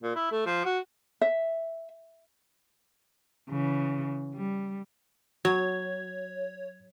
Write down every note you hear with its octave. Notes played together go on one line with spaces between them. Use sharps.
A#2
E4
A3
F3
F#4
E5
C#3 E3
G3
F#3 F#4 C#5 G#6